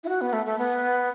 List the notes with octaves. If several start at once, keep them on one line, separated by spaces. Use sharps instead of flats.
E4
F#4
B3
A3
A3
B3